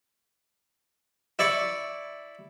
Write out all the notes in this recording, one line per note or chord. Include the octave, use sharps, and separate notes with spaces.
E4 D5 C#6